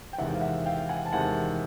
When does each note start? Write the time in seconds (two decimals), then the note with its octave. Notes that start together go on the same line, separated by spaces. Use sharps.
0.13 G5
0.18 E2 C3 D#3 G#3 E5 F#5
0.34 F5
0.41 E5 F#5
0.66 F5 G5
0.89 F#5 G#5
1.06 A5
1.13 E2 C3 D#3 G#3 F#5 G#5